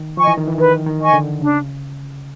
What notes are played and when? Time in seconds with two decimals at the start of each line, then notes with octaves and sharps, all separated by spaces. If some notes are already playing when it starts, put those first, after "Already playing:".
Already playing: D#3
0.17 F3 D#5 G#5 C#6
0.27 E3
0.37 D#3
0.48 E3
0.58 D#3 B4
0.86 D#3
1.00 D#5 G#5 C#6
1.14 D3
1.41 C#3 D4